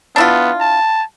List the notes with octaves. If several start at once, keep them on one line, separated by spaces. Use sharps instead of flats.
B3 D4 E4 F4
A5